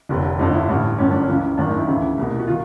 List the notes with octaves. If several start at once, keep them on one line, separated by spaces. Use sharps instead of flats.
F1 D#2 D3
G1 F2 D3 D#4
E4
A1 G2 D3 E4
G1 F#2 D3 C#4
D4
C#4
C#2 C#3 E3
G#1 F#2 D#3 D4
D#4
E4
D2 C#3 E3
C2 B2
F#4
D#3 F4